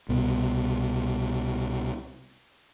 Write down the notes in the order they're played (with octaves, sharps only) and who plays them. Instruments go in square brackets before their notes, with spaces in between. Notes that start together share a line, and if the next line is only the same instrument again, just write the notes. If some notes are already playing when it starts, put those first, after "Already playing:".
[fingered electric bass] C2 B2